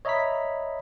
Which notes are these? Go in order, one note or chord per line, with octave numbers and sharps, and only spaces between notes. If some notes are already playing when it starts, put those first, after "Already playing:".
C#5 D#5 E5 A#5 B5 B6